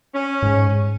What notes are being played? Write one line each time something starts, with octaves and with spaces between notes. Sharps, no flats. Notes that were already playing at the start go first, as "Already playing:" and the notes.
C#4
G#2